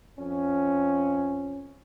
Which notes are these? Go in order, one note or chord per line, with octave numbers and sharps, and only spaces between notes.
F2 C#4